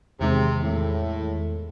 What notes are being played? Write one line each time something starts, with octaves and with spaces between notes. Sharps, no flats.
E2 C3 D#3 G#3
A2